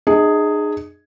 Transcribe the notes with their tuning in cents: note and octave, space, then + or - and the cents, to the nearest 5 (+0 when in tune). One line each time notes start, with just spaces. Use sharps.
D#4 -45 G#4 +0 D#5 +25